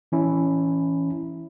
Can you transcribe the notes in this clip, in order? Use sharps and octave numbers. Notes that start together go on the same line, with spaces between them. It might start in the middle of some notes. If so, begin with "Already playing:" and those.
E3 C#4 E4